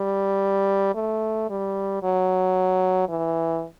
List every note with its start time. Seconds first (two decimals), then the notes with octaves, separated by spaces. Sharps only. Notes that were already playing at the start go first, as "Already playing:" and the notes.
Already playing: G3
0.95 A3
1.50 G3
2.03 F#3
3.09 E3